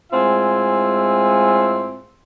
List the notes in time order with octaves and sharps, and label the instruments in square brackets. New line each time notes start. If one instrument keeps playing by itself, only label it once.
[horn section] A2 G#3 C4 F4 E5 G#5